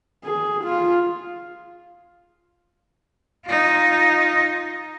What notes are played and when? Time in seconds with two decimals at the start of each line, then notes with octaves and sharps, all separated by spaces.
0.24 G#4
0.64 F4
3.45 D#4 F4